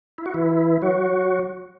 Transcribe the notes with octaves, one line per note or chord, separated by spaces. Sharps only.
E4
F#4
E3 E4
F#3 F#4